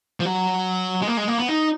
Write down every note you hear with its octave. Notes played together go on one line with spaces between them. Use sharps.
F3
F#3
G#3
A#3
G#3
A#3
B3
D#4